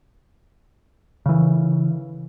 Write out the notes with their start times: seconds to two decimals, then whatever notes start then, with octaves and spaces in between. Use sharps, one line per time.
1.26 C#3 E3